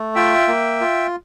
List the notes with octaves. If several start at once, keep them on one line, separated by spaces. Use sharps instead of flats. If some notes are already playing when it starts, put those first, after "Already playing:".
Already playing: A3
F4 E5 G5
A#3
F4